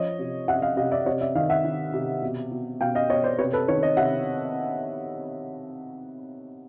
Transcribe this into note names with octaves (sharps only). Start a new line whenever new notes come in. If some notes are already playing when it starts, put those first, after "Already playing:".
Already playing: F3 C#5 D#5
C3
C3 E5 F#5
D#5 F5
C3 D#5 F5
D5 E5
C3 C#5 D#5
D5 E5
D#3 D#5 F5
E5 F#5
D#3
C3
B2
B2
B2 F5 G5
D#5 F5
B2 C#5 D#5
C5 D5
C3 B4 C#5
A4 B4
D#3 B4 C#5
C#5 D#5
C3 E5 F#5